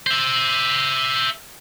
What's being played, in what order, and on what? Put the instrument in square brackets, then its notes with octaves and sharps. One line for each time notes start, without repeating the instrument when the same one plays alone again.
[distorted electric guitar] C5 E5